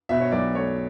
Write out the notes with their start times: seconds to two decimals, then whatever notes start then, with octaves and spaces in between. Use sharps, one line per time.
0.09 B2 E5
0.21 C#5
0.32 B1 D5
0.54 A3 C#5